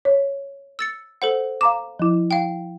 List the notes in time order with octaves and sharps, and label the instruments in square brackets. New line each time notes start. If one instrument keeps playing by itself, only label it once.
[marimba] C#5
[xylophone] E6 A6 C#7
A4 C5 F#5
[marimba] F5 A#5 D6 [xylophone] E7
[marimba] F3 E4
[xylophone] F5 G5